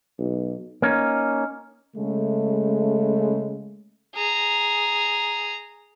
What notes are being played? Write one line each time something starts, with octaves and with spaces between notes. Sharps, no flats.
B1
A#3 C#4 D#4
C#3 G#3 A3
G#4 A#5